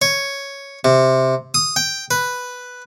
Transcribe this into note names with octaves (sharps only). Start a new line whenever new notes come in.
C#5
C3
D#6
G5
B4